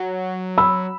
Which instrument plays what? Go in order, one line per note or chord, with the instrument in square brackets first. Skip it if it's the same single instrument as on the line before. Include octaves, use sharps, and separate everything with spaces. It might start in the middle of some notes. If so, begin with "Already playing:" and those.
Already playing: [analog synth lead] F#3
[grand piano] B5 E6